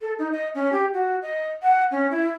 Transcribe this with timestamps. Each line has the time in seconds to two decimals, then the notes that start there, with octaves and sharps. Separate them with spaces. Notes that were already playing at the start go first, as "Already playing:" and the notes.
0.01 A4
0.19 D#4
0.32 D#5
0.55 C#4
0.73 G4
0.94 F#4
1.22 D#5
1.63 F#5
1.91 C#4
2.11 E4